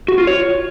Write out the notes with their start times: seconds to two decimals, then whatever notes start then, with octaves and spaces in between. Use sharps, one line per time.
0.08 F#4
0.18 F4
0.27 C#5